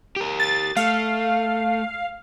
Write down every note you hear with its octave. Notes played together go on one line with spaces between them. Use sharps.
G4 A#4
A6
A3 F5